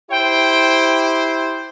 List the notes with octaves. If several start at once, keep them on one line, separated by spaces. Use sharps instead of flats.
E4 G4 C5 G5